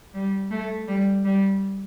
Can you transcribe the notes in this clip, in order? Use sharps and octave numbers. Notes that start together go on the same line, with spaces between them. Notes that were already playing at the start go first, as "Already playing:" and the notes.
G3
A3
G3
G3